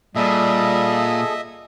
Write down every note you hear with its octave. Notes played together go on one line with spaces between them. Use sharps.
A#2 G3 G#4 A4 D#5 E5